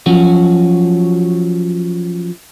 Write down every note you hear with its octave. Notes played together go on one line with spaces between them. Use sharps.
F3 F#3 C#4 F#4